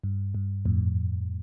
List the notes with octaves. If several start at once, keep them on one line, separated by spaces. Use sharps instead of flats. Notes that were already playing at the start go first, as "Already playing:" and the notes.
G2
G2
F2 A2